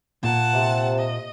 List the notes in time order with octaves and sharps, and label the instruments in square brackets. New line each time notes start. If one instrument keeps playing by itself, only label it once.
[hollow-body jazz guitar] A#2 [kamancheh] F#5 A5
[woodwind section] C3
[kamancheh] D#5